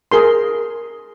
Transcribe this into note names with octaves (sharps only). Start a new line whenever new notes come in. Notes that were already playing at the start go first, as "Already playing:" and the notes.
G#4 A#4 C6